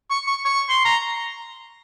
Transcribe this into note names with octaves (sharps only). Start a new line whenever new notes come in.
C#6
C#6
C#6
C6
A#5